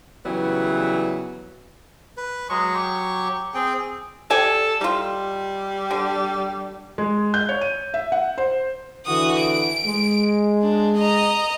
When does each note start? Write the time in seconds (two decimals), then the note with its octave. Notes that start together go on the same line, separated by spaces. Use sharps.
0.26 C#3 E3 F#3 G3 B3
2.17 B4
2.49 F#3 G#3 C#6
2.75 G4
3.54 C4 G#4 G5
4.30 G4 A4 D5 G#5
4.81 G3 D#4 F4
5.91 D3
6.98 G#3
7.34 G6
7.49 C#5
7.61 D#7
7.94 E5
8.12 F#5
8.38 C5
9.06 D3 E3 F#4 D#6
9.40 D7
9.85 G#3
10.63 D4
10.98 D#5 A#5